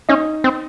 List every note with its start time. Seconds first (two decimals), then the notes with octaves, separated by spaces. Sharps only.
0.09 C#4 D#4
0.44 C4